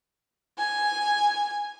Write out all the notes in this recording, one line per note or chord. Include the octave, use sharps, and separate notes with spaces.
G#5